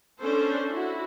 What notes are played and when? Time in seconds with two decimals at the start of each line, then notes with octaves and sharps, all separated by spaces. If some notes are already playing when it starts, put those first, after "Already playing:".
0.22 C#4 D4 A4 C5
0.71 E4 F#4